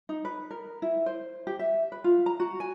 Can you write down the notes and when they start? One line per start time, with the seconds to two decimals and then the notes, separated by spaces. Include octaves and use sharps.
0.09 D#4
0.25 B4
0.51 A#4
0.82 E4
1.06 C5
1.47 G4
1.59 E5
1.92 B4
2.04 F4
2.26 A#5
2.40 F#4
2.60 G#5